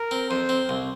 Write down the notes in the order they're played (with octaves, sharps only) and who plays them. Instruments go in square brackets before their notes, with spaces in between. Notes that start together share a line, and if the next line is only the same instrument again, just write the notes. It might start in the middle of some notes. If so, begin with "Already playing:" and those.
Already playing: [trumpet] A#4
[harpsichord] C4
[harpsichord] F2 [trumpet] C5
[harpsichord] C4
C2